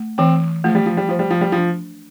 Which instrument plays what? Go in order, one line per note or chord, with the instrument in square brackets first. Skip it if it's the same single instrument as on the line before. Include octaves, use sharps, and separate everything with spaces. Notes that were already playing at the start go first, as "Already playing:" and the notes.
Already playing: [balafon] A3
[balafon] E3 [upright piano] C4
[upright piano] F3 [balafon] A3
[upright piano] G3
F3
G3
[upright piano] F3 [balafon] C5
[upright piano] G3
F3
G3
[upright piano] F3 [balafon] D4